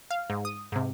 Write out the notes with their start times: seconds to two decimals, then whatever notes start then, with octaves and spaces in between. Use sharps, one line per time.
0.11 F5
0.30 G#2
0.45 D#6
0.72 G#2 C3